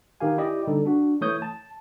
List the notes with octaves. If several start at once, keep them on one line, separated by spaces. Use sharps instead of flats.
D#3 D#4 G4 F5 G#5
E4 G4 D5 D#5
D3 G3 D#4 A4
D4 F#4
E3 A3 E4 C#5 D#6 G6
A5